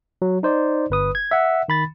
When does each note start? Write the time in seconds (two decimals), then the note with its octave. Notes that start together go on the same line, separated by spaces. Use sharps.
0.22 F#3
0.43 D#4 C5 D5
0.90 G1 B4 D#6
1.15 G#6
1.31 E5 F#5
1.68 D#3 B5 A6